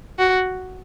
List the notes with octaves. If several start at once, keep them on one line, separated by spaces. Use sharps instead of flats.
F#4